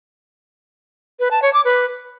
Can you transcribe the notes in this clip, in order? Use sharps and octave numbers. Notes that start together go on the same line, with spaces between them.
B4
A5
C#5
D6
B4